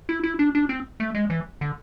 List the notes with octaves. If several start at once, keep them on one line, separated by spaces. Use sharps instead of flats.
E4
E4
D4
D4
C4
A3
G#3
E3
D3